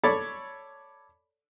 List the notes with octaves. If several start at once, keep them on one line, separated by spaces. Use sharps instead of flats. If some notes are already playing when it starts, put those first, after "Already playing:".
A4 C#5 D5 B5 D6